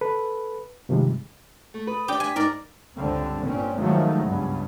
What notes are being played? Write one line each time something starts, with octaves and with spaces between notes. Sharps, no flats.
A4 B4
G2 C3 D#3 F3 G3 G#3
A3
A4 B4 D#6
C4 D4 G4 D5
G#5 B6
G#2 D#4 A#4 D5
C#2 G2 D3 C4
G1 A#2 C4 C#4
D#3 F3 F#3 G#3 A3
C#2 G2 B3